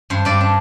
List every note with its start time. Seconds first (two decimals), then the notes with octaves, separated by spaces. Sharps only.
0.10 G2 C5
0.25 G2 D5
0.41 D4